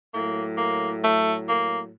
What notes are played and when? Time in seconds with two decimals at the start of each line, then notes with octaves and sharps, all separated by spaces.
0.13 A2 F#3 A#3
0.58 A#3
1.02 A3
1.47 A#3